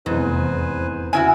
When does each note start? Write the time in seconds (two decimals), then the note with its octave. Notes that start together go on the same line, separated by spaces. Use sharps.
0.06 F1 E2 G#2 B4 C5 G#5
1.13 C#3 E4 F#4 G#5